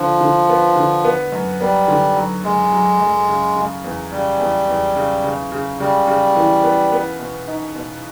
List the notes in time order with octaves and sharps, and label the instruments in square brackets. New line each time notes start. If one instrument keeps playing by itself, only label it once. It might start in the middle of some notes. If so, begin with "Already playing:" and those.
Already playing: [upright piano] D3 [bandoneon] F3
[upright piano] D3
B3
D3
B3
F#2
[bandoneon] G3 [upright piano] B3
[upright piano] D3
F#3
[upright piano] F#2 [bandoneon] G#3
[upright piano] F#3
F#2
C#3
C#3
E2
[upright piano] C#3 [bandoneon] G3
[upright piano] E2
E2
C#3
C#3
C#3
[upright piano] C#3 [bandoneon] G3
[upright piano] C#3
E3
B3
B3
B2
D#4
B2